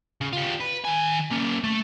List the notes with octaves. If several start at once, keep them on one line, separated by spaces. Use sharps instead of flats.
C#3
G3 F4
B4
D#3 G#5
A#3 C#4
A3